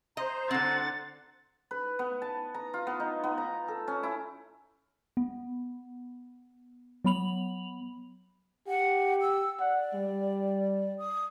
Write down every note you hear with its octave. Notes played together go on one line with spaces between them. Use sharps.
C5 D#5 A#5
D3 C4 F#5 A6
B4
B3
A5
A#5
F4
B3
D#4
B3
A#5
A4
C#4
E4
B3
F#3 B3 B5 F7 F#7
G4 F#5
E6
D5 F#5
G3
D#6